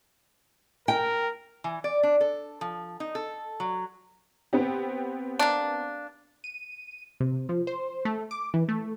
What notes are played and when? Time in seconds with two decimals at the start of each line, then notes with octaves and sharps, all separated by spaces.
0.88 A#4 G5
1.64 E3
1.84 D5
2.03 D4
2.21 A4
2.61 F3
3.00 D#4
3.15 A4
3.60 F#3
4.53 B3 C4 G4
5.39 A#3 D4
6.44 D#7
7.20 C3
7.49 F3
7.67 C5
8.05 A3
8.31 D6
8.54 E3
8.69 A3